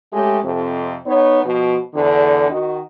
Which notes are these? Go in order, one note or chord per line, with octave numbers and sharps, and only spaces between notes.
G#3 A3 C#4 G4
F2 C3
B3 D#4 C#5
B2 F3
E2 D3
D#3 F#4 D#5